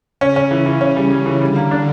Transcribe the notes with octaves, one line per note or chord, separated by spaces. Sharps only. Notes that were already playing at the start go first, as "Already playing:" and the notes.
C#3 C#4
C#4
E3
E3
C#4
G3
G3
E3
D3 G3
A#3
D4